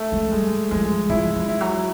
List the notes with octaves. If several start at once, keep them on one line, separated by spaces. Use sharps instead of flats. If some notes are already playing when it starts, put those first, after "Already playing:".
Already playing: A3
G#3
G3 G#3
F3 G#3
F3 E4
F3
E4
F#3